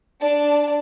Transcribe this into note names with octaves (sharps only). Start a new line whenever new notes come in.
D4 D5 A5